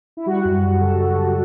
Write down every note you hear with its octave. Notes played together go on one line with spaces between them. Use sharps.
E4
G3 F#4
F#2
F#2
C#3 A4
C#3
F#2